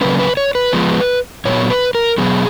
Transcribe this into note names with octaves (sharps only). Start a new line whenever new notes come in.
C#3 F#3 A#3 C#4 B4
B4
C#5
B4
F3 G#3 B3
A#2 F#3 B3 C#5
B4
A#4
B2 F#3 B3 G#4